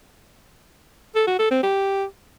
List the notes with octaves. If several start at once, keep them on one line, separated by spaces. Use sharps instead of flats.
A4
F#4
A4
C4
G4